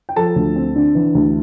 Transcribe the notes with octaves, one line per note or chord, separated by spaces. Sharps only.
G5
F3 A4 A5
D2
C4
D3
E3
D2